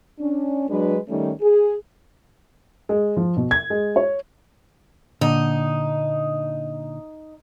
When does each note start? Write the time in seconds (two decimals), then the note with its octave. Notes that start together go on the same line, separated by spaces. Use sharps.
0.19 C#4 D4
0.68 F#3 G#3 D4 B4
1.09 D#3 G3 A3 C#4 D#4
1.41 G#4
2.89 G#3
3.17 F3
3.37 B2
3.51 G#6
3.70 G#3
3.96 C#5
5.21 A#2 D3 D#4